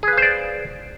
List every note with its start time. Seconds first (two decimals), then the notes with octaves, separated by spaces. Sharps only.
0.03 G#4
0.08 B4
0.13 F5
0.18 C5
0.22 D5